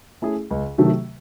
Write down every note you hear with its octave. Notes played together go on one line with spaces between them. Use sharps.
A3 C#4 E4 G#4
C#2
C3 D#3 F#3 A3